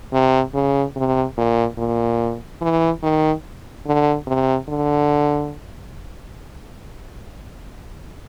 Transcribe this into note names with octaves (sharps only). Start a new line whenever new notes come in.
C3
C#3
C3
A#2
A#2
E3
D#3
D3
C3
D3